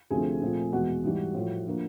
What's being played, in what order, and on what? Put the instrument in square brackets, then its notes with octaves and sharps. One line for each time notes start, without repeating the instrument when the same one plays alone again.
[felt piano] D2 C3 F3 A3 C4 G#4 G#5
A#2 F3 A3 C4
E2 B2 G#3 B3 F#4 F#5
G#2 E3 G3
A2 F3 A3
D3 F3 A#3